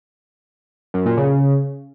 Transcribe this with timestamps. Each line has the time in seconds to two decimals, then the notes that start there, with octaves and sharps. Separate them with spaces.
0.94 F#2
1.06 A#2
1.17 C#3